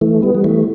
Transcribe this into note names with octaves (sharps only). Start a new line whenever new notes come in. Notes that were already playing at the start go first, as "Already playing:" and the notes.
E3 A3
G3 B3
G3
E3 A3